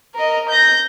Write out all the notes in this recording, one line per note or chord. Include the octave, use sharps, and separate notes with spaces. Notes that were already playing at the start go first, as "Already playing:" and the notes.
A#4 D#5
G6 A#6